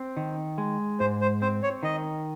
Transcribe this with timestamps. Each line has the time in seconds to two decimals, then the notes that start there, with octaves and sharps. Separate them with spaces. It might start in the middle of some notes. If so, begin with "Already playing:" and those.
Already playing: C4
0.17 D#3
0.58 G#3
1.00 G#2 C5
1.21 C5
1.42 C4 C5
1.63 C#5
1.83 D#3 D#5